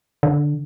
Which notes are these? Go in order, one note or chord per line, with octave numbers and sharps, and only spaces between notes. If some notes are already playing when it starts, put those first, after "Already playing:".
D3